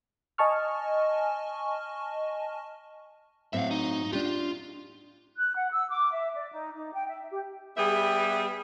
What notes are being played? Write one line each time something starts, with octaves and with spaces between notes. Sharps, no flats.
D#5 G#5 A5 C#6 F6
A2 F#3 C4 E5 F5
D#4
D4 F4 G4
F#6
F#5
E6
D6
E5
D5
D#4
D#4
G5
E5
G4
G3 B3 G4 G#4 E5